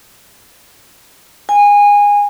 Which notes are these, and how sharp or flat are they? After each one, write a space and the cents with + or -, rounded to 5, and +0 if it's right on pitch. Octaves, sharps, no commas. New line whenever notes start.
G#5 -20